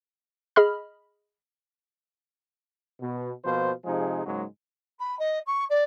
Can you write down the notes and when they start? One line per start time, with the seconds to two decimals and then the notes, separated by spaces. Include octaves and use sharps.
0.56 G#4 D#5 B5 F6
3.01 B2
3.45 B2 F3 A#3 F4 C5
3.85 C3 F3 G#3 D#4 G#4
4.25 G#2 C#3 F#3 G#3 A#3
4.99 B5
5.19 D#5
5.46 C#6
5.69 D5